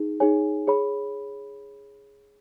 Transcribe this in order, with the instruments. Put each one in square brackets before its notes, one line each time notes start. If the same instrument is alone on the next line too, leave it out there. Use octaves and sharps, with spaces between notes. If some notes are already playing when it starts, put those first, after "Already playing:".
Already playing: [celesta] D#4 G#4
D#4 G#4 C#5 G#5
G#4 C#5 B5